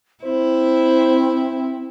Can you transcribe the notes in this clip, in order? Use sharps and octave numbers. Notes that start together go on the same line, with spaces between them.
C4 E4 C5